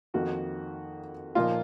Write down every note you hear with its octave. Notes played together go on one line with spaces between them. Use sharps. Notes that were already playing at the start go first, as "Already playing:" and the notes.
F2 D#3 A#3 D#4 F#4
A#2 F3 A#3 D#4 F4